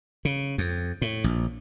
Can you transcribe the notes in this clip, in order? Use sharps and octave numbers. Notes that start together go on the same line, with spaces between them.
C#3
F2
A2
A#1